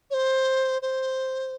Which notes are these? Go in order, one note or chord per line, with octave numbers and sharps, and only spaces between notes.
C#5
C5
C5